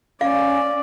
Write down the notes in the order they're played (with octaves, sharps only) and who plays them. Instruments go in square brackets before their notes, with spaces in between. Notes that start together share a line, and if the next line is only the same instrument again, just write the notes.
[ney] C#4 [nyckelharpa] D5 [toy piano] F5